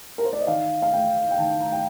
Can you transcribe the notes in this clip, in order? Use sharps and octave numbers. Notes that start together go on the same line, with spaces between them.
A#4
C5
D5
D#5
D#3 F5
F5
A3 G5
G5
D#3 A5
A#5
G5